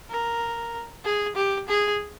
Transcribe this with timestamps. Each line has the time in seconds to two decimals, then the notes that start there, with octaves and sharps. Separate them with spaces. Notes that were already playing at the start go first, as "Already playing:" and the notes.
0.10 A#4
1.05 G#4
1.36 G4
1.69 G#4